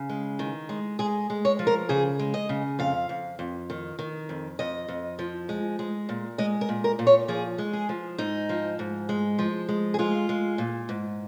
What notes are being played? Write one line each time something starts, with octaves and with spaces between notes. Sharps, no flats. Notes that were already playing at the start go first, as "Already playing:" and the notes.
Already playing: C#3
G#3
D#3
G#3
G#3 G#4
G#3
C#5
F3
A#4
C#3 G#4
G#3
D#5
C#3
F2 F5
F2
F2
D#3
D#3
F2
F2 D#5
F2
F3
G#3
G#3
A#2
G#3 D#5
A#4
A#2
A#4
A#2
C#5
F3 G#4
G#3
G#4
F3
G#2 D#4
F3
G#2
G#3
F3
G#3
G#4
G#3 F4
G#3
A#2
G#2